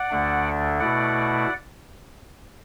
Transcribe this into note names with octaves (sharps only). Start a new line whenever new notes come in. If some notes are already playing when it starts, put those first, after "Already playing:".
Already playing: D5 F#5
D2 D3 A3 D4
B2 A3 E4 D5 F#5